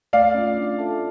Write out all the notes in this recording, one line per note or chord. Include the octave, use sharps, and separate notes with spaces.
A3 D5 F5
C#4 F4
D4
F4 A4 E5 A5